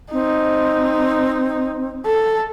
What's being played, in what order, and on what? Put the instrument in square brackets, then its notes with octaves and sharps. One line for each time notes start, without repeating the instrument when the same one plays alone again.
[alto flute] C4 [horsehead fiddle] D#4
[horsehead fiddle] A4